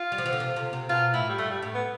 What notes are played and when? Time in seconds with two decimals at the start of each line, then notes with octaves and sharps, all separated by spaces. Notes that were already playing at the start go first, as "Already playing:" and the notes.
Already playing: F4
0.12 G3
0.18 F3
0.26 E3
0.33 D3
0.40 C3
0.56 C3
0.73 C3
0.89 B2 F4
1.13 A2 E4
1.29 G3
1.38 G2 A3
1.51 G3
1.62 A2
1.74 B3